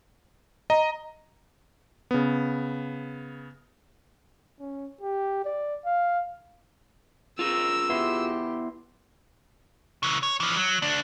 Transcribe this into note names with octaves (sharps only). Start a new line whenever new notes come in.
D#5 A#5
C#3 B3
C#4
G4
D5
F5
C4 F4 G#4 A#4 E6
B3 E4 G4 C6
C#3 E3
C#5
E3 F3
F#3
D2 D4